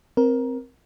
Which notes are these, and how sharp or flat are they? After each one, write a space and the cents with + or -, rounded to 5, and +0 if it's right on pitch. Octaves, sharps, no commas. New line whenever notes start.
C4 +0 A#4 +15